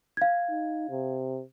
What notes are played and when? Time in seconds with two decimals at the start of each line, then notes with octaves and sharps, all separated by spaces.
0.17 F5 G#6
0.50 D#4
0.90 C3